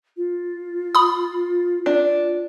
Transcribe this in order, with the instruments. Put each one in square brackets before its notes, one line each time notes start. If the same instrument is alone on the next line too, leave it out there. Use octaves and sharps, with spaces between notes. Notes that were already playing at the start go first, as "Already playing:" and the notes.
[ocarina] F4
[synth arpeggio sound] B5 D#6
[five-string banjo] D4 [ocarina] F4